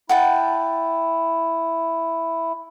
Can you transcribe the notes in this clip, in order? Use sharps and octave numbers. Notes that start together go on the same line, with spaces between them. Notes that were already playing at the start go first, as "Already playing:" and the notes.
E4 F#5 G5 A5